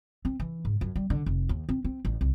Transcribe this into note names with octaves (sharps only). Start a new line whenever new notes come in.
C4
E3
G#2
F#2
G3
D3
F1
D#2
C4
C4
A1
C2